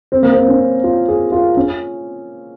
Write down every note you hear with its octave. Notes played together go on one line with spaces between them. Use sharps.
C4
A#3
C4
C#4
F4
G#4
F4
C#4